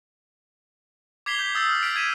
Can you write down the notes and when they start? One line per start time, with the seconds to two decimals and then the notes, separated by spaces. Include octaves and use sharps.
1.26 D6 G#6 B6 C7 F7 G7
1.39 G6
1.55 D#6 E6 G6 A6
1.68 E6 F6
1.82 F6 B6 D7
1.96 G#6 D#7 E7